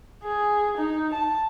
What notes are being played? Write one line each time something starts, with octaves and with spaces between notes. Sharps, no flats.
G#4
D#4
A5